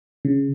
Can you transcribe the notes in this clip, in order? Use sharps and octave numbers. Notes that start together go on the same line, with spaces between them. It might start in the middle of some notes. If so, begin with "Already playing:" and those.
C#3